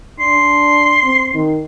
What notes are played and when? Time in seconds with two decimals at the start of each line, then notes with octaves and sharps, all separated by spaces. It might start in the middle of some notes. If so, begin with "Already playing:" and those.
0.20 D4 C6
1.03 C4
1.34 D#3